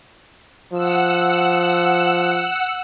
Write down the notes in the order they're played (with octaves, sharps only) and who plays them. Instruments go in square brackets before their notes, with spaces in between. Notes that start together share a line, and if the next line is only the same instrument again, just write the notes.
[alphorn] F3 [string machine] F#5 E6